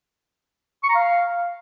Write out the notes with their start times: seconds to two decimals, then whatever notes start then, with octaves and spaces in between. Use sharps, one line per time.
0.84 C#6
0.89 A#5
0.95 F5